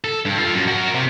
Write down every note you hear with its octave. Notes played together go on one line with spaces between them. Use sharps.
A4
G2
F4 A4
F#2
F#4 A#4
C3